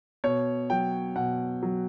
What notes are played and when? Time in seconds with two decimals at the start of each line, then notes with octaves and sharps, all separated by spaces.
0.24 B2 C#5
0.70 F#3 G5
1.16 B2 F#5
1.63 F#3